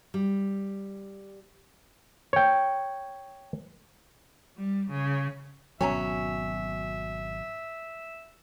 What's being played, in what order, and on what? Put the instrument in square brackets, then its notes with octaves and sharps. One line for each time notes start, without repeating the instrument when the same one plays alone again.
[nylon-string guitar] G3
[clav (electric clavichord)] C#5 G5
[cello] G3
C#3
[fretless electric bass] G#1 B2 F#3 [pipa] C#4 G#5 A#5 [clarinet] E5